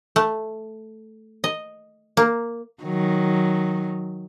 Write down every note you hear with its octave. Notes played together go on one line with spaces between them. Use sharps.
A3
D#5
A#3
D#3 F#3